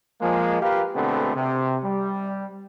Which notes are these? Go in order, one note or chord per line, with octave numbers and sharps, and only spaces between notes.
F3 G#3 A#3
F4 G4 A#4 B4 F5
B2 D3 G#3 A3 B3 C4
C3
G3